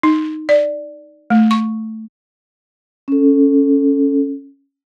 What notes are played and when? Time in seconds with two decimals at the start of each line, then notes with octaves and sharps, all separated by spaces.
0.03 D#4
0.49 D5
1.30 A3
1.51 C#6
3.08 C#4 A4